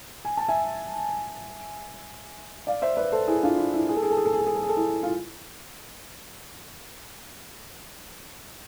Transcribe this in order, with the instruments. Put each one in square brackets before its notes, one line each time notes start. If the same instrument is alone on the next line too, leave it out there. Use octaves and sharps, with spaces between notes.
[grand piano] G#5
A5
E5 G#5
D5 F5
C5 E5
B4 D5
A4 C5
E4 G#4
D4 F4
E4
E4
G#4
A4
G#4
A4
G#4
A4
G#4
A4
G#4
A4
G#4
A4
E4 G#4
F4